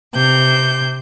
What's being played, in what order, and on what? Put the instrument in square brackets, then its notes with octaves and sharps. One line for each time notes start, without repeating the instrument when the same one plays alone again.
[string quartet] C3 G6